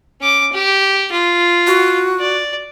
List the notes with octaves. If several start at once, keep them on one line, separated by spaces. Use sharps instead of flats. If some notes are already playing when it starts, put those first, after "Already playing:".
C#4 D6
G4
F4
F#4
D5